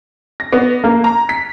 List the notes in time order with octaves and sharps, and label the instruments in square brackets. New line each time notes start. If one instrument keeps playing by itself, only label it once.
[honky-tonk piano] A#6
B3
A#3
A#5
B6